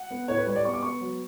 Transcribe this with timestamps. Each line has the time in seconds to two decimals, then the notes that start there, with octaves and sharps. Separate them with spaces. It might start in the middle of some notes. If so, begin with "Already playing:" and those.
Already playing: F#5
0.11 B3
0.28 A2 C#5
0.38 B4
0.46 G3 C#5
0.56 D5
0.65 B3 C#6
0.74 D6
0.83 B3 C#6
1.01 F#3